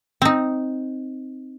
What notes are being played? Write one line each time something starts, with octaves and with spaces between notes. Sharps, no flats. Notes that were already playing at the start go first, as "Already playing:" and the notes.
C4 D#4